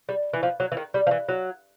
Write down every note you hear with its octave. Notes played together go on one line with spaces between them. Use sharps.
G3
E3
F3
F#3
E3
D#3
G3
F3
E3
F#3